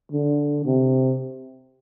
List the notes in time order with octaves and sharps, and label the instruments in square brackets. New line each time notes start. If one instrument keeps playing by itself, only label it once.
[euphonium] D3
C3